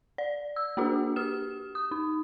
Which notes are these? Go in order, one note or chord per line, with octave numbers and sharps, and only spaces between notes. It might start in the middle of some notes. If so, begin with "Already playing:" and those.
D5
E6
A#3 D4 F#4 G#4
G4 F6 E7
D#6
D#4